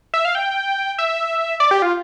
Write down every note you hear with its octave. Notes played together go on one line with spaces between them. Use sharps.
E5
F5
G5
E5
D5
G4
F4